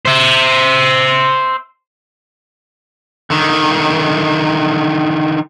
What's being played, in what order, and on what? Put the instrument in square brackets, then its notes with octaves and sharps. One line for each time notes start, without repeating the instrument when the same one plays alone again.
[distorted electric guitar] C5 E5
[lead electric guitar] D3 D#3